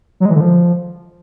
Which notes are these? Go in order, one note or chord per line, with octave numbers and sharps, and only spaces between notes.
F#3
G#3
E3
D3
F3